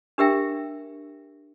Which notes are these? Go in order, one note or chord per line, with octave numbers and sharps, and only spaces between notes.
D4 G4 A#4 E5 G5